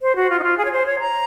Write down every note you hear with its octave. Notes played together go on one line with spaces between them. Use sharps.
C5
F#4
F4
D#4
F4
G#4
C#5
C5
C#5
A#5